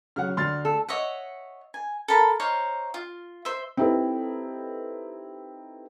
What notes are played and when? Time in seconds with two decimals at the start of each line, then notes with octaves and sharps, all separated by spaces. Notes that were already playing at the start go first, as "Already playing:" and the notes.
0.16 C#3 F#3 C#4 F#5 F6
0.37 D2 C6 F6 A6
0.65 A4
0.89 C#5 D#5 E5 F#5
1.74 G#5
2.08 A4 A#4 A5 B5
2.40 D#4 C5 C#5 F5
2.94 F4
3.45 C5 E5
3.77 C4 D#4 E4 G4 A4 B4